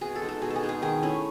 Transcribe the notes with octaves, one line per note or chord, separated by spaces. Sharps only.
B2 G#4
A4
G#3 D#4
A4
B2 G#4
A4
G#4
G#3 D#4
G#4
D#3 G#4
A3 C#4 E4